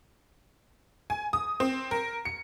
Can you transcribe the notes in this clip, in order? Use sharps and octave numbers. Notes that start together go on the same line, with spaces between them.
G#5
D#6
C4
A#4
C#7